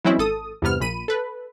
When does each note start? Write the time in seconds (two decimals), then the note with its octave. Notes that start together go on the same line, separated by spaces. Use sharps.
0.04 E3 F#3 G#3 C4 C#4 E4
0.18 G#1 A4 D#6
0.62 E2 G2 C3 B3 F6
0.80 A#1 A#2 B5 D#7
1.08 A4 B4